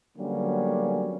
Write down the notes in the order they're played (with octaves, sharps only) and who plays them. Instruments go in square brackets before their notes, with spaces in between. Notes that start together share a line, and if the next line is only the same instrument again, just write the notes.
[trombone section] D3 F#3 G3 A#3 B3 C#4